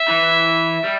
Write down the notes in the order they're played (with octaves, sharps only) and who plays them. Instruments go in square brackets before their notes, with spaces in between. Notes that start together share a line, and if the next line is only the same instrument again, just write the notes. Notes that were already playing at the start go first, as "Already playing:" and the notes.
Already playing: [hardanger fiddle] E5
[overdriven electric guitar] E3
G3